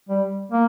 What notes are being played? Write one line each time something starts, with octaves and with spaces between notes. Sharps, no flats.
G3
A#3